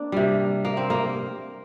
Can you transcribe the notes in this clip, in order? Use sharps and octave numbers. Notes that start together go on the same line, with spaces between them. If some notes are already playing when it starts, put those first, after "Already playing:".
Already playing: A#3 C4 D4
C3 G3
A#3
C4
A#3